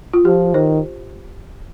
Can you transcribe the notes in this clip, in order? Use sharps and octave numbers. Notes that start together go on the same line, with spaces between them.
F4
F3 G4
D#3 C5